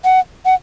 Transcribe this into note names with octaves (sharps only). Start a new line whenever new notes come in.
F#5
F#5